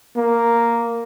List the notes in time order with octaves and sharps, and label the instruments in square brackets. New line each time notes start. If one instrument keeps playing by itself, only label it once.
[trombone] A#3